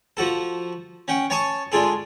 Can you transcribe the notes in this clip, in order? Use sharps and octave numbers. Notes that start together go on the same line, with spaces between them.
F3 F#4 A4
C#4 F#5 G5
C#5 G#5 A5 C#6 D#6
G#3 D4 F4 G#4 A4